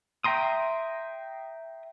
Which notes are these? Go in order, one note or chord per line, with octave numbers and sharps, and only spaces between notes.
E5 G5 A#5 C6 D#6